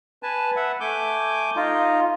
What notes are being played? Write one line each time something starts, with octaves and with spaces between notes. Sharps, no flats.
B4 G#5 A5
E5 F#5
A3 G#5 D6 G6
D#4 F4